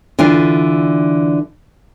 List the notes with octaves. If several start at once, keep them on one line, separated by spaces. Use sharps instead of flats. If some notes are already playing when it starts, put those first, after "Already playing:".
D3 E3 D4 F4